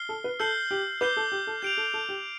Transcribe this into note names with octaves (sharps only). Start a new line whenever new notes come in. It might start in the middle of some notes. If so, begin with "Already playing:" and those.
Already playing: F6 C7 G7
A4
B4
A4 E6 G6 C7 G7
G4
B4 D6 G6 C7 G7
A4
G4
A4
G4 G6 D7 F7
A4
A4
G4